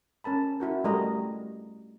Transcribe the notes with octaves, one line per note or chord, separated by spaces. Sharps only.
C#4 A#4 A5 B5
E4 F#4 A#4
G3 A3 A#4 D#5 A#5